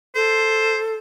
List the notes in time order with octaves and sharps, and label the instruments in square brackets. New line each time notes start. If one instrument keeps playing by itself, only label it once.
[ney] A4 [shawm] C5